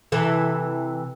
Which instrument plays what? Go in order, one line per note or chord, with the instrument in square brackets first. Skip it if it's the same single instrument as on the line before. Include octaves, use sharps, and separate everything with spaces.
[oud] C3 E3 A4